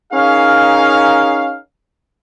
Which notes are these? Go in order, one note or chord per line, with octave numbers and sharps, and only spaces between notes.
C#4 D#4 G#4 A#4 F5